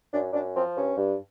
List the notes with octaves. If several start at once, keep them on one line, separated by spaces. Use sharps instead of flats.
F#2 D4
F#2 D4
F3 C4
G2 C#4
G2